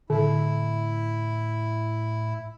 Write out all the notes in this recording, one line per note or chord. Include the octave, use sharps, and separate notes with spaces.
A2 D3 E4